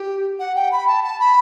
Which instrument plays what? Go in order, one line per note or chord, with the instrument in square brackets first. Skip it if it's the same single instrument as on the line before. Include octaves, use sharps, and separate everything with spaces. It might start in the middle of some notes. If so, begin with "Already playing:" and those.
Already playing: [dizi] G4
F#5
G5
B5
A5
A5
B5